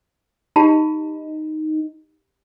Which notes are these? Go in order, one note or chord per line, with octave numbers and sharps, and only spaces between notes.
D#4 G4 A5 B5